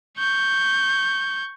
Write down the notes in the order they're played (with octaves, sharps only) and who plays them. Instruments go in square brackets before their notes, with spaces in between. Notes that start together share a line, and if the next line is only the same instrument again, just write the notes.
[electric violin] C#6 G6